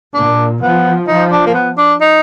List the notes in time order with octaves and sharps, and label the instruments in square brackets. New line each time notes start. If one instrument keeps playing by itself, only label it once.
[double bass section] A#2 [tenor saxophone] D4
[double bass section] F3 [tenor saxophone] B3
[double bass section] F3 [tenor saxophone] D#4
[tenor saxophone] D4
A#3
B3
D4
D#4